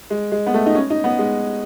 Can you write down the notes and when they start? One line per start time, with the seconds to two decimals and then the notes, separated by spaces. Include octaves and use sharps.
0.10 G#3
0.32 G#3
0.47 B3
0.54 A3
0.66 D#4
0.75 C#4
0.90 D#4
1.04 B3
1.19 G#3